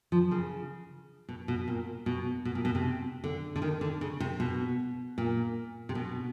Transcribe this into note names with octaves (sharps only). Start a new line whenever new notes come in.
F3
C#3
B2
B2
A#2
B2
B2
A#2
B2
C3
D3
D3
D#3
D3
C#3
C3
B2
A#2
C3
B2